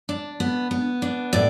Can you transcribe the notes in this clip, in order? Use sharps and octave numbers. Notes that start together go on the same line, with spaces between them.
D4
B3
B3
D4
A2 D5